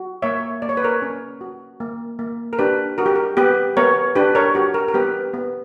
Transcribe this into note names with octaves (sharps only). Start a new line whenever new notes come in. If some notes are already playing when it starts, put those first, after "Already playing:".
Already playing: F#4
A#3 C#5 E5
A#3 D5
C#5
B4
A#4 C#5
C#4
F#4
A#3
A#3
A#4
D4 G4 B4
F#4 A#4
G4
A#4
B3 G4 B4
B3 A#4 C#5
D4 G4 B4
A#4 C#5
F#4 G4
A#4
A#4
B3 G4 B4
B3